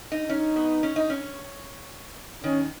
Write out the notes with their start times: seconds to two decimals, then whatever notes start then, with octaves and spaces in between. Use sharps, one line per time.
0.12 D#4
0.29 C#4 D#4
0.56 B3
0.83 C#4
0.96 D#4
1.10 C#4
2.44 D#3 C#4